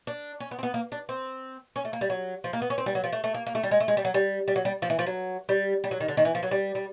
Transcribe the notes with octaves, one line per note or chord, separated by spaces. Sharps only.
D4
C#4
B3
C4
B3
A#3
D4
C4
C#4
A3
A#3
G3
F#3
F3
A#3
B3
C#4
C4
G3
F#3
F3
A3
A3
A#3
A#3
A3
G3
G#3
A3
G#3
G3
F#3
G3
G3
F#3
G3
F3
E3
F3
F#3
G3
G3
F#3
D#3
D3
D#3
E3
F3
F#3
G3
G3